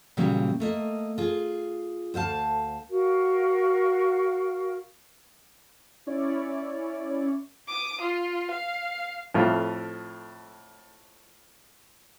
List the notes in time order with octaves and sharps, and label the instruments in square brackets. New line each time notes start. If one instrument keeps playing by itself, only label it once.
[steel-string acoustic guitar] A#2 C#3 E3 F#3 G3 A#3
A3 A#3 D#5
F4 G#4
D2 C5 F5 A5
[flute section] F#4 A#4 F5
[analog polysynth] C#4 E4 C#5 D5
[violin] D6 D#6
F4
F5
[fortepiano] F2 A2 F4